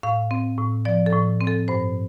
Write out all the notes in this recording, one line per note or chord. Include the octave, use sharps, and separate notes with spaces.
A2 F5
C4
A2
F3 D5
A4
A2
C4
A4
G2 C5